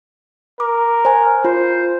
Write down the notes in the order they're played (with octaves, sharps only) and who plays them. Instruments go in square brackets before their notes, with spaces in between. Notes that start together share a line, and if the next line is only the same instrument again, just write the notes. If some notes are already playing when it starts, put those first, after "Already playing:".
[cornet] A#4 [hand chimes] D6
[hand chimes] C5 G#5
[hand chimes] F4 [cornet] C5